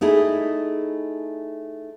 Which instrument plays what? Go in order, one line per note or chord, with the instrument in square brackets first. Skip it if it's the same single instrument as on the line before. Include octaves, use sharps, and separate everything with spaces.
[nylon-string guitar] A3 D#4 E4 G#4